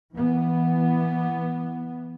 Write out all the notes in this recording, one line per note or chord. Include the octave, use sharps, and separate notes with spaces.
E3 B3